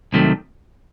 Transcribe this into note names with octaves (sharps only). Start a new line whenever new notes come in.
C2 C3 D#3 F#3 A3